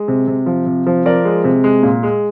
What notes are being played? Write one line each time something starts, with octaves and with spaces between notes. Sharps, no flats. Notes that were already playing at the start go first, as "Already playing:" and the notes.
Already playing: G#3
C3
C3
F3
C3
F3
F3 A#4 D5
G#3
C3
G#3
A#2
G#3